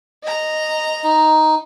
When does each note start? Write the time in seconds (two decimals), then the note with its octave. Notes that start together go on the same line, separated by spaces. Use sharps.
0.23 D#5 A#5
1.04 D#4